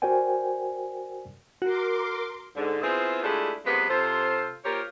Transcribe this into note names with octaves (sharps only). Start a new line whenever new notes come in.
F#4 A#4 C5 D5 G5 G#5
F#4 A#4 C6 D6
G#2 D3
B3 C4 E4 F4 G#4
G#3 A3 D4 E4 F4 G4
F#2 C3 F3 G#3 B3 B4
C3 F4 A4 C5
A#3 F4 G4 A#4 C5 C#5